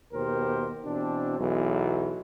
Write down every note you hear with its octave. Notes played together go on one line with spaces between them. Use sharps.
D#2 B2 G4 A#4 C5
B2 E3 C4 D4
B1 E2 E3 F#3 G#3